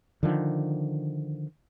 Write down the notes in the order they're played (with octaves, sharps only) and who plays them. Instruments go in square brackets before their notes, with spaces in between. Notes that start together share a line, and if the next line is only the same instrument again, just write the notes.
[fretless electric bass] D3 D#3 F3